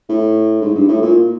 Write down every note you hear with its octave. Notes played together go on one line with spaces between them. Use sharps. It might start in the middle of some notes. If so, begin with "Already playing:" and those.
A2
G#2
G2
A2
A#2